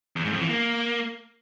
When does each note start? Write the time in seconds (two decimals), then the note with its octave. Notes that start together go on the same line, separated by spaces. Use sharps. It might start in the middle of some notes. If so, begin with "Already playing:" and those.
0.16 E2
0.25 G#2
0.33 F2
0.41 E3
0.49 A#3